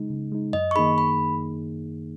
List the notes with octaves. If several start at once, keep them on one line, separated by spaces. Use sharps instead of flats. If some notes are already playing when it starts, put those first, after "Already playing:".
Already playing: C#3 G#3 D#4
C#3
G#3 D#4
F#2 D#5
C#6
D#3 A#3 D#4 G#4 B5
B5